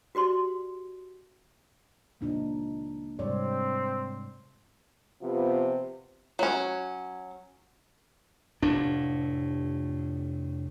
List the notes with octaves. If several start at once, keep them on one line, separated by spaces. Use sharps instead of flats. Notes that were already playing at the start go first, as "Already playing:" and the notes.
F#4 G4 D5 C6
C#2 A#2 F3 A#3 D4 D#4
G#2 C3 G3 C4 C#5 D5
C3 F3 B3 F4
F#3 C#4
F1 A2 D4